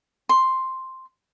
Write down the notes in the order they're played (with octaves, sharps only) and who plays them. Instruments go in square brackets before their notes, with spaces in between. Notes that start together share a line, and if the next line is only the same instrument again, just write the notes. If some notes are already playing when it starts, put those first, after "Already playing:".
[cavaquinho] C6